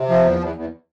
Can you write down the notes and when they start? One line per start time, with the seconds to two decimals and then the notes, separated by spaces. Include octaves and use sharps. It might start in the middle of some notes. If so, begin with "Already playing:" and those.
Already playing: C3
0.09 F3
0.24 E2
0.40 E2
0.56 E2